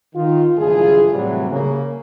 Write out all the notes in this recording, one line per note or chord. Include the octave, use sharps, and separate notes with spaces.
D#3 F4
F#1 G2 E3 A3 F4 G#4
A2 C3 E3 F#3 G3
C#3 A#3